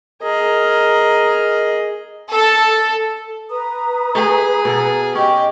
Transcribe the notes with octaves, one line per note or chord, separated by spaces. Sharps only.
G#4 A#4 D#5
A4
B4 A#5 D#6
A3 G#4
B2 A4 A#4
C#4 G4 D#5